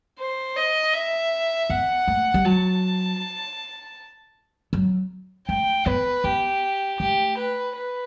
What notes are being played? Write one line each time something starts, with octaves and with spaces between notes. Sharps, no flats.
C5
D#5
E5
B3 F#5
A3
G3
F#3 A5
F#3
A3 G5
B3 B4
B3 G4
A3 G4
B4
B4